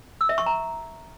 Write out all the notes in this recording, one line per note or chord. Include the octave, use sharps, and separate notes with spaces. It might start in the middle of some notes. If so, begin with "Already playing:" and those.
E6
E5
C#6
A#5